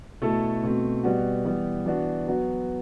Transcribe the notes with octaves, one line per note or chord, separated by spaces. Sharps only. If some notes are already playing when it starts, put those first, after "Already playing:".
B2 A3 E4 A4
B2 A3 C4
B2 G3 B3 F#4
E3 G3 B3
E3 B3 D4 F#4
F#3 B3 F#4